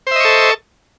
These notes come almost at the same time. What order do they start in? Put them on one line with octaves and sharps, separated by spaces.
C5 E5 D#5 C#6 A4